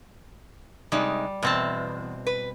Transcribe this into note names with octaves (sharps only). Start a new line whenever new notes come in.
C3 G3 G#3 D#4
E2 B2 C4 A5
B4